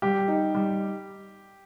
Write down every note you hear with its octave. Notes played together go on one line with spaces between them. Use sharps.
G3 G4
D#4
G3